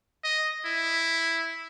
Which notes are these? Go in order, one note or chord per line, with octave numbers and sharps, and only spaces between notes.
D#5
E4